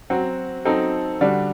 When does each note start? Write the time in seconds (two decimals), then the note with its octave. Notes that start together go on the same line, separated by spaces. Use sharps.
0.10 F#3 C4 F#4
0.65 F#3 C4 D#4 A4
1.21 D3 G3 D4 F#4